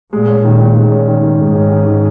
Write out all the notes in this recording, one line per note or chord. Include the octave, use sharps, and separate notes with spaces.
A#2 G#3
C#4
A#2 D#3
D#3
A#2 G#3
C#4
D#3
D#3
G#2 G#3
C#4
D#3
D#3